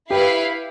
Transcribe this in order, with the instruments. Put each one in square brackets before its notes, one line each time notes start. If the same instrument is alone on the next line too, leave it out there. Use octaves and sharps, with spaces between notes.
[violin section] E4 B4 F5 [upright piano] G4